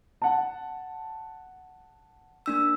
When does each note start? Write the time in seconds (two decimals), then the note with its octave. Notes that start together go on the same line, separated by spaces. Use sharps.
0.22 F#5 A5
2.46 A#3 D4 E6